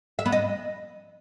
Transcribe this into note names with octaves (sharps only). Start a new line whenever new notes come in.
E5
B3
D#5